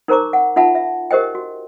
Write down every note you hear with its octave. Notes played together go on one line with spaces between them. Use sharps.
D#4 A#4 C5 A#5 C#6 D6
F#5
D#4 F4 E5 F#5 A5 B5
E5
G4 A#4 C5 D#5 G5
F#4